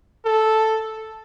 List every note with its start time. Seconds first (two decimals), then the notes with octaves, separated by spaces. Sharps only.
0.25 A4